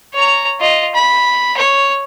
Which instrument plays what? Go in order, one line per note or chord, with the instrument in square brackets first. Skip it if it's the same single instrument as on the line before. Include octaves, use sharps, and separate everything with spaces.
[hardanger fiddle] C#5 A#5
F4 D#5
B5
C#5